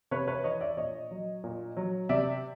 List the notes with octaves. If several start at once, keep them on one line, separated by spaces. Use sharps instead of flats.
C3 B4 C#5
B4 C#5
E3 C#5 D#5
D5 E5
A#2 C#5 D#5
F#3
A#2
F#3
C3 D5 E5